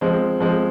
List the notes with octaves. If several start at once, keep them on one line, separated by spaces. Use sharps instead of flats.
F3 G#3 C4
F3 G#3 C4